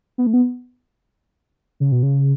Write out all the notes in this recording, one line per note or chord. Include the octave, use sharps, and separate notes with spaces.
B3
A3
B3
C#3
B2
C#3